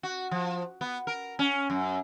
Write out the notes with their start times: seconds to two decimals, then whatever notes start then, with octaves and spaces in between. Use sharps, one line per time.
0.03 F#4
0.31 F3
0.81 B3
1.07 A#4
1.39 C#4
1.70 F#2